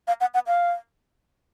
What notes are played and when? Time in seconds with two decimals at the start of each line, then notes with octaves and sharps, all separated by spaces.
0.08 F5
0.21 F#5
0.34 F#5
0.47 F5